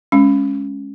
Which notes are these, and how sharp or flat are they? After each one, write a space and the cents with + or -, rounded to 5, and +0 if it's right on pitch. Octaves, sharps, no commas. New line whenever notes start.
G#3 +5 C#4 +0